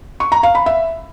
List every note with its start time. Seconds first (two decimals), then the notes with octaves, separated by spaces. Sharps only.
0.20 C#6
0.32 A#5
0.43 F5
0.55 B5
0.66 E5